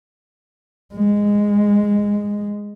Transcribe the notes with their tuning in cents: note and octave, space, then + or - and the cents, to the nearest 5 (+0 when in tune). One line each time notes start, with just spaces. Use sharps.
G#3 -10